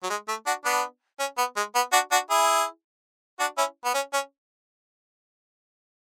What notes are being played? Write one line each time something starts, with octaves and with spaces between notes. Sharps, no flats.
F#3
G#3
A3
D4 F#4
B3 D4
C#4
B3
G#3
B3
D4 F#4
D4 F#4
E4 G#4
D4 F#4
C#4 E4
B3
C#4
C#4